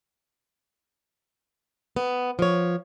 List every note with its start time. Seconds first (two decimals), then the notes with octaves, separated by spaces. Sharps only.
1.96 B3
2.39 F3 C#5